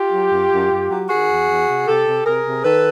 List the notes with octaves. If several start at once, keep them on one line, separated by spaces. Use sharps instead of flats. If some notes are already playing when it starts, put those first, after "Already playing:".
Already playing: F4 G4
F#3
F#2
F#2
F#2
F#3
D#3 F#4 G#4
E2
E2
C3
C3 G4 A4
C3
C3 G#4 A#4
C3
D#3 A4 B4